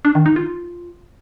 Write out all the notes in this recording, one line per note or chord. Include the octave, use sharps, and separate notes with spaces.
D4
D#3
D#4
F4